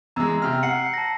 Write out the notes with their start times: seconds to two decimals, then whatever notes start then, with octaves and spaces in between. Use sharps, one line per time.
0.16 E2 G#3 A#5 E6
0.42 C3 F6
0.63 F#5 C7 C#7
0.94 A5 A#6